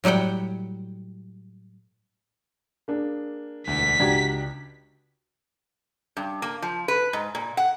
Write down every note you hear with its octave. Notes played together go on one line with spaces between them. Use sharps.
A2 F#3 G3 F#5 G5
A#3 D4 G#4
E1 D2 B6
C#2 D4 F#4 G4 A#5 G#6
G2
A#3
F3
B4
G#2
A#2
F#5